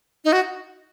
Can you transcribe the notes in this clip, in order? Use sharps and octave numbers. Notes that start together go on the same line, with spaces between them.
D#4
F#4